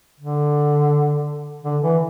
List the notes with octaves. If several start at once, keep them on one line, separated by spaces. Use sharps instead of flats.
D3
D3
E3